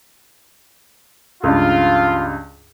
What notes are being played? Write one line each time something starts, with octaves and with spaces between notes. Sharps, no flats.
C#2 G2 F4